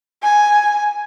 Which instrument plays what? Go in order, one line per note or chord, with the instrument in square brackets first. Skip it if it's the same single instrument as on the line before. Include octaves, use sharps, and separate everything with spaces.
[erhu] G#5